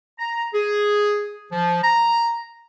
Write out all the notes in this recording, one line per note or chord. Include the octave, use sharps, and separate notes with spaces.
A#5
G#4
F3
A#5